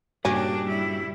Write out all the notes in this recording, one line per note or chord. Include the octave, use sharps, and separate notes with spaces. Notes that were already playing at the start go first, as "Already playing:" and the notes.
G2 A#2 C#3 A#3 C#4 D4 F#4 G4
G3 E4